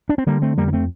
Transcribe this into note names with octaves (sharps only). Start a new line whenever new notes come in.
D4
C4
D3 G3 A#3
A3 C4
F2 G3 A#3
A#3
A3 C4